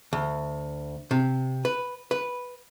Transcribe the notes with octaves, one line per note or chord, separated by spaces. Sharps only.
D2
C3
B4
B4